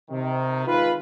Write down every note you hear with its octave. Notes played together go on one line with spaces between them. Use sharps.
C3 D#3
D#3 G#3 F4 B4